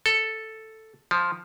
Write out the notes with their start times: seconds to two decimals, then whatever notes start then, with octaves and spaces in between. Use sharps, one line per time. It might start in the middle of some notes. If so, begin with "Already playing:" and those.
0.06 A4
1.11 F3